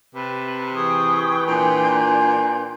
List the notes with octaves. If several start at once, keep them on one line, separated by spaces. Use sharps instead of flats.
C3 B4 A5
E3 G#4 B4 G5 C#6 D#6
A#2 D4 G#5 C6 G6